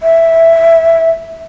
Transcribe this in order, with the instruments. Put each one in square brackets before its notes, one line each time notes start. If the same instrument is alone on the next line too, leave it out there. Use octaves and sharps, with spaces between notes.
[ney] E5